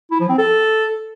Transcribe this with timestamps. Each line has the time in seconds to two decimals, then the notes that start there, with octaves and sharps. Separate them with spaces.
0.11 E4
0.20 F3
0.29 C4
0.38 A4